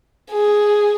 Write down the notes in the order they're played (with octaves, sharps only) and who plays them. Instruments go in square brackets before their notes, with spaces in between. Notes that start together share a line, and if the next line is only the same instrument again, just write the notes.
[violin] G#4